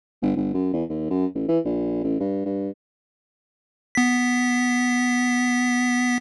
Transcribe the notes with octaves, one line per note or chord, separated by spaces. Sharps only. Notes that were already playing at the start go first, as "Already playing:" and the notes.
G1
G1
F#2
E2
D#2
F#2
A1
E3
A#1
A1
G2
G2
B3 B6